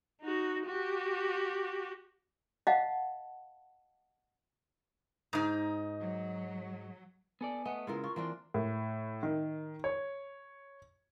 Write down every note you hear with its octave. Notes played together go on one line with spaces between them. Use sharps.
D#4 F#4
F#4 G4
D#5 F5 F#5 A5
G#2 D#4
F#3
B3 A4 D5 G#5
A3 B3 D#5
C#3 G#3 E4 F4 A#4 F5
F4 C#6
E3 A#3 C4 D4 C6
A2
D#3
C#5